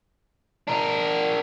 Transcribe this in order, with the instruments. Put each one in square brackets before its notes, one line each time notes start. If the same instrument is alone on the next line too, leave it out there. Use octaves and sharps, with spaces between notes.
[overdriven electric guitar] D4 A#4